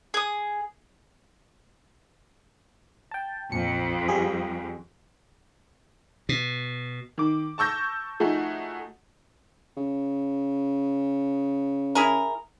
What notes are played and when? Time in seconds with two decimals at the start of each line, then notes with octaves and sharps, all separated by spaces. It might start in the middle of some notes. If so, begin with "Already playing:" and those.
0.14 G#4 D#6
3.11 G5 A5
3.52 A#1 F2 C#7
4.08 G3 G4 G#4
6.29 B2
7.18 D#3 D6
7.58 A5 C#6 E6 G6 A#6
8.20 F3 A3 D#4 F#4 G#4
9.77 C#3
11.95 E4 G#4 A#4